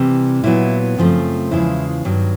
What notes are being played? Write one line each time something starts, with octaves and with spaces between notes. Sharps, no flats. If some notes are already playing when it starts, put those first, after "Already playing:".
Already playing: C3 E3 G3
A#2 F#3 B3 E4
F#2 C#3 F3 A3 C4
E2 C#3 F3 G#3 E4
G2 D#3 F#3